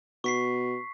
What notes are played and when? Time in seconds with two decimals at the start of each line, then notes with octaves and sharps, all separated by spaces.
0.24 B2 C#6 B6 C7